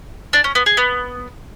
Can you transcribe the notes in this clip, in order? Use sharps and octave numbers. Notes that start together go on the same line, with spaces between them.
D4
C#4
B3
G#4
B3